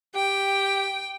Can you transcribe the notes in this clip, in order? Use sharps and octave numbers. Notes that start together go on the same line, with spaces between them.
G4 G5